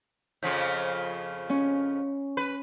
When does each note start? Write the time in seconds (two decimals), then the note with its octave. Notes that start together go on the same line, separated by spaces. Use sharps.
0.43 F2 C#3 F3 G6
1.50 C#4
2.37 B4